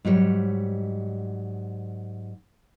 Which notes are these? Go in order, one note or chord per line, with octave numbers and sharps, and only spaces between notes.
G#2 F#3 G3 C#5